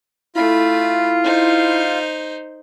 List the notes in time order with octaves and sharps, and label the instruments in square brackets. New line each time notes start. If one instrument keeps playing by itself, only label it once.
[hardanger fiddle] A3 B5 [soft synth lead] E4 [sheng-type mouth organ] F4
[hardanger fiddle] D#4 C5